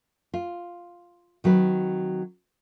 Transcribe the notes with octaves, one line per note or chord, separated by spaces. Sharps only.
F4
D#3 F#3 C4 B4